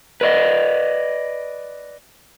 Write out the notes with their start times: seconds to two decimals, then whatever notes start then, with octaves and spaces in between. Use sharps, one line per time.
0.21 B4 D5 D#5